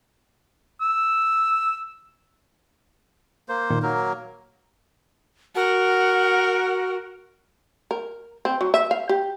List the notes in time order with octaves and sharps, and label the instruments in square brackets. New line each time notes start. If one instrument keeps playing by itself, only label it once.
[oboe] E6
[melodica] A#3 C5
[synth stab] A#2 D#3
[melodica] F#3 A#3 A#4
[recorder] F#4 [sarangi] A#4 [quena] F#5
[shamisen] A#4
C4
F#3
E5
F5
G4